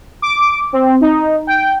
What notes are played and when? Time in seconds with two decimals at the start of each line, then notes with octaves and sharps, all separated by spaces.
0.22 D6
0.73 C4
1.01 D#4
1.47 G5